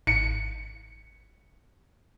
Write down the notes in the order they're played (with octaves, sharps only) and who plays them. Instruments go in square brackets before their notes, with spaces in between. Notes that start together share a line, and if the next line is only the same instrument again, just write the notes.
[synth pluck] G#1 [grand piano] C#7